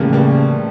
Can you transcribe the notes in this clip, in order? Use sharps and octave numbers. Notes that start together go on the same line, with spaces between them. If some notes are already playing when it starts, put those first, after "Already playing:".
Already playing: A2 C#3 E3 F3 G3 A3 A#3
G3 A#3